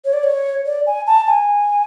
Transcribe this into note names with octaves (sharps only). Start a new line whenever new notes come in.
C#5
D5
C#5
D5
G#5
A5
G#5